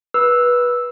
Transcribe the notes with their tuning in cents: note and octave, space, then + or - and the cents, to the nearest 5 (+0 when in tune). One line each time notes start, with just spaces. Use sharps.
B4 -20 E6 +0